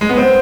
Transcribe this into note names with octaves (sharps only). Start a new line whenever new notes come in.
G#3
B3
C4